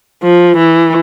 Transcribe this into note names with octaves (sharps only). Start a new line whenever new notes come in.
F3
E3